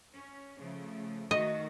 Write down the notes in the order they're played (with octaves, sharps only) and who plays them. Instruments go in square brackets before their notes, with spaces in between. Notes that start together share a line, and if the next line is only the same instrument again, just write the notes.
[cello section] C#4
C#3 F3 A3
[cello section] D#3 A3 F#4 [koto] D#5